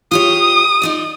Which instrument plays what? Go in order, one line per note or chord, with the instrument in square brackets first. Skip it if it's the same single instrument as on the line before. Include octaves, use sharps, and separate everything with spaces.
[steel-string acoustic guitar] F4 G4 C#5 [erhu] D#6
[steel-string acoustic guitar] D#4 F4 D5